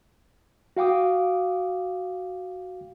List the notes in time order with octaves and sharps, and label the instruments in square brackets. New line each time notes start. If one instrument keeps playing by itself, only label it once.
[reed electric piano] F#4 F5 G5 D6 D#6